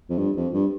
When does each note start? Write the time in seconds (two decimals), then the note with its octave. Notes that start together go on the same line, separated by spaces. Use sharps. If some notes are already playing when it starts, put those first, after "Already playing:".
0.10 F2
0.18 G2
0.36 F2
0.53 G2